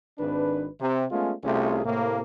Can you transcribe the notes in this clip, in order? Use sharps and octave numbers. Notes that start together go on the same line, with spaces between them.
G#1 D4 B4
C3
G#3 A3 B3 C#4 F4
C2 C3 A3 C#4 F4 G#4
A2 C3 A#3